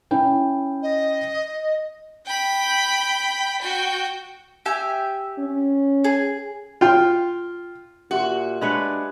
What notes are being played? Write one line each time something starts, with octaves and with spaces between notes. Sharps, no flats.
C#4 E4 G5
D#5
G5 B5
F#4 G5
G4 E5 G#5
C#4
G#4
F4 G5
A#2 F#4 G4 E5 C6
G#3 D4 B4 C#5